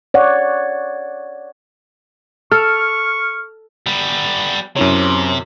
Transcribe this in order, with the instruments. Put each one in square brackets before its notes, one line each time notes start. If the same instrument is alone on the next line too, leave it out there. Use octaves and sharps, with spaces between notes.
[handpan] C#5 D5 F#5
[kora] A4 [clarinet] C#6 [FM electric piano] F6
[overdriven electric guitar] G3 B3
[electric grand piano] F#2 E4 C#5 [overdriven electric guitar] C3